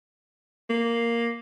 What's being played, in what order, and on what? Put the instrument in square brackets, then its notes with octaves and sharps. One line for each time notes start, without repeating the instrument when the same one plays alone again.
[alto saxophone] A#3